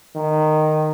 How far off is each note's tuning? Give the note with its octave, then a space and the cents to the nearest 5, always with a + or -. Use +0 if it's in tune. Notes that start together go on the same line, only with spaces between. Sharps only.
D#3 -10